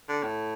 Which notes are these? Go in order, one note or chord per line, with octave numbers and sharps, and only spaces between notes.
D3
A2